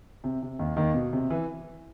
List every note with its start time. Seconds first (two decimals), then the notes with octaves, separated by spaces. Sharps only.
0.24 C3
0.42 C3
0.59 D#2 D#3
0.77 D#2 D#3
0.94 B2
1.13 C3
1.30 E3